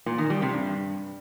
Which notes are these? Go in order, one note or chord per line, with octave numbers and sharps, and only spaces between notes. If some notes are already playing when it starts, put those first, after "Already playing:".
A#2
D#3
G3
C3
G2